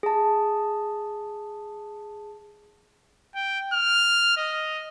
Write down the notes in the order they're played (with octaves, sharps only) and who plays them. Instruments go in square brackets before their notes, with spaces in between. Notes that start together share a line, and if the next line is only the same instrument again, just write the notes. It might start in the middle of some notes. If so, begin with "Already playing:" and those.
[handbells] G#4 A5
[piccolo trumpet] G5
F6
D#5